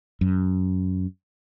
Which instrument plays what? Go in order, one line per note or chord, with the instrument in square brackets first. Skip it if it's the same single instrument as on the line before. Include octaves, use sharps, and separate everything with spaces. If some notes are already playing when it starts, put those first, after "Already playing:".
[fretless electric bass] F#2